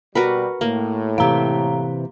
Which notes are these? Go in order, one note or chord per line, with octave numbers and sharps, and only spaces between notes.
B2 G3 F#4 A#4 B4
A2 A#3
C3 E3 F5 A#5